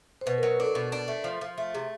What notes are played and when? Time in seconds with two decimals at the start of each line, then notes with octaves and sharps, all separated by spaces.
0.21 C5
0.26 B2 B4
0.38 F#3 A#4
0.51 B4
0.60 D4 A4
0.75 B2
0.92 D4
1.08 A3
1.24 F3
1.41 F3
1.58 A3
1.74 C3 G#4